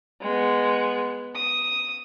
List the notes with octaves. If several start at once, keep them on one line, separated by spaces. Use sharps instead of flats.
G#3 B3
D#6